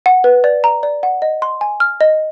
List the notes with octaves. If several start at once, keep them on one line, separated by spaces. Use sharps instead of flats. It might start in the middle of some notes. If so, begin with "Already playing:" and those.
F#5
B4
D5
A#5
D5
F#5
D#5
C6
G#5
F6
D#5